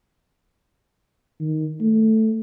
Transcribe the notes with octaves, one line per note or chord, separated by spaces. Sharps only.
D#3
A3